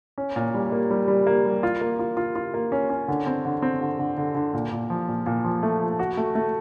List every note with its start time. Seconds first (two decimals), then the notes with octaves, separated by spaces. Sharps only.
0.18 C#4
0.36 A#2
0.54 G3
0.72 A#3
0.91 G3
1.08 G3
1.27 A#3
1.45 G3
1.63 F4
1.81 A#3
1.99 F4
2.17 F4
2.36 F4
2.54 A#3
2.72 C#4
2.90 C#4
3.08 D3
3.27 C4
3.45 D3
3.62 C4
3.81 D3
3.99 D3
4.17 D3
4.35 D3
4.54 A#2
4.72 A#2
4.90 F3
5.08 A#2
5.26 A#2
5.45 F3
5.63 A3
5.81 F3
5.99 F#4
6.17 A3
6.35 A3